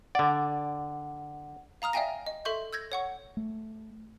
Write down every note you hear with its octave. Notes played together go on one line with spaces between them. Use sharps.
D3 D5 F#5
F5 A#5 D#6 F6
D5 E5 F5 G5 G#5 A#6
D#5
A4 E5 C6 C#6 G6
E6 G6 G#6 A#6
C#5 F#5 C#6
A3